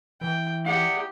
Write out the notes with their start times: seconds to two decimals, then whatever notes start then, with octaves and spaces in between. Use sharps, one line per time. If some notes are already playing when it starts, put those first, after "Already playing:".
0.21 E3 G5
0.66 E4 G4 D5 F#5